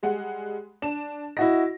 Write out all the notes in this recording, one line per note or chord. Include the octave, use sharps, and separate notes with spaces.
G3 G#3 F#5
D4 E7
E4 F#4 D#5 A#6